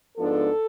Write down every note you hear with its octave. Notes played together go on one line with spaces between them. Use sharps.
G#2 F3 B3 D4 A4